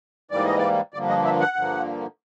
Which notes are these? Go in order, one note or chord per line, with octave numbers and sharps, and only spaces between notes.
G#2 E3 G3 A#3 D5
D#5
D5
G2 D3 F3 A#3 D5
D#5
E5
F#5
G2 D3 F3 A#3